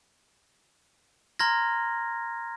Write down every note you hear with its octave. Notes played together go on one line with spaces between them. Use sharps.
A#5 C6 F6 G#6 A#6